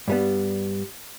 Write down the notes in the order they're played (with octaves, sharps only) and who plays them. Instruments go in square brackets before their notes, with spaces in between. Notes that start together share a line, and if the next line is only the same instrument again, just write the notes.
[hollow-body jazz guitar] G2 G3 B3